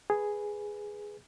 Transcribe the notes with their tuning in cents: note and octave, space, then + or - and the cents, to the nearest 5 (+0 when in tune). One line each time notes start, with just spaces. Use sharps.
G#4 +0 B4 +0